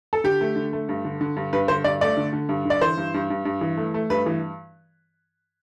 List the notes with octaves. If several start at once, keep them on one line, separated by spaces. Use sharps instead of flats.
A4
D3 G4
A3
D3
A3
G2
D3
D3
G2
G2 B4
D3 C5
G2 D5
A3 D5
D3
D3
G2
D3 D5
E3 C5
G2
G2
G2
G2
E3
A3
A3
G2 B4
E3